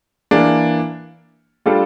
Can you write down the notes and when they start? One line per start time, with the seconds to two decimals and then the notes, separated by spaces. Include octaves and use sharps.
0.31 E3 A#3 D4
1.66 G3 D4 F4 A4